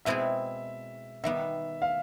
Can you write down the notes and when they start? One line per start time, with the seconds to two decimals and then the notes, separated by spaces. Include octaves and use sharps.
0.05 B2 G#3 C4 E4 G#4 E5
1.24 D#3 G3 B3 E5
1.82 F5